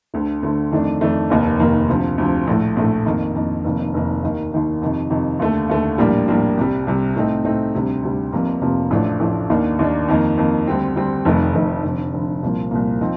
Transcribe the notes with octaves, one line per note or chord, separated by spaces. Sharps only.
D2 D3 A3
D2 D3 A3
F2 D#3 A3 D4
F2 D#3 A3 D4
F1 D#2 D#3 A#3
F1 D#2 D#3 A#3
D2 C3 F3
D2 C3 F3
A#1 A2 A3
A#1 A2 A3
F2 D#3 A#3
F2 D#3 A#3
F1 F2 D#3 A#3
F1 F2 D#3 A#3
D#2 D#3 A#3
D#2 D#3 A#3
F2 C3 D#3
F2 C3 D#3
D#2 D3 A3
D#2 D3 A3
A#1 A2 G3 A#3 D4
A#1 A2 G3 A#3 D4
C2 C3 G3
C2 C3 G3
A2 A3 C4 D#4
A2 A3 C4 D#4
D2 C3 G3
D2 C3 G3
F1 F2 C3 F3 A#3
F1 F2 C3 F3 A#3
A1 A2 F3 A3 D4
A1 A2 F3 A3 D4
D#2 D#3 A#3 D4
D#2 D#3 A#3 D4
F2 D#3 A#3
F2 D#3 A#3
D2 D3 G3 C4
D2 D3 G3 C4
F1 F2 D#3 A3
F1 F2 D#3 A3
F1 F2 D3
F1 F2 D3
C2 A#2 F3 A#3
C2 A#2 F3 A#3
F3 C4 D#4